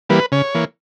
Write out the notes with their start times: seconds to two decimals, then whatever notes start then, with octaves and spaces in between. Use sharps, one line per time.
0.10 E3 G3 A#3 B4
0.32 C#3 C#5
0.55 E3 A#3